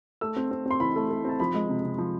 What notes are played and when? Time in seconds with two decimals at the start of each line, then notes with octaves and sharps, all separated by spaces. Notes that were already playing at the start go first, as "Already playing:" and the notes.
0.21 A3 E6
0.36 C4
0.51 C4
0.66 C4 C6
0.80 E3 B5
0.96 A3
1.10 A3
1.25 C4 A5
1.40 F3 B5
1.54 G#3
1.69 C3
1.84 C3
1.98 F3